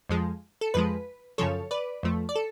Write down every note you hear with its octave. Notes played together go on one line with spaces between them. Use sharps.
F2 F3 G#3
A4
F2 F3 G#3 B4
F#2 C#3 F3 A4 C#5
B4 D5
F2 F3 A3
D5
A4